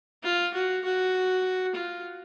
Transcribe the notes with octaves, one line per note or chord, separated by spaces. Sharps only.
F4
F#4
F#4
F4